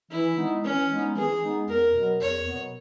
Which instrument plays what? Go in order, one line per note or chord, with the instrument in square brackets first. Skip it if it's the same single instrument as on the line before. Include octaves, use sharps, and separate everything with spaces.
[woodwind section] E3 [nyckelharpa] E4
[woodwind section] G#3 B3 D#4
[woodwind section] E3 [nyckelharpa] C#4
[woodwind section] G#3 B3 D#4
[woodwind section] E3 [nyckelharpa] G#4
[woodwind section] G#3 B3 D#4
[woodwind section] E2 [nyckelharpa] A#4
[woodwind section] B2 F#3 B3
[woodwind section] E2 [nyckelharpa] C#5
[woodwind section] B2 F#3 B3